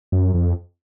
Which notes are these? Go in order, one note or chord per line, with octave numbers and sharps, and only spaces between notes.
F#2
F2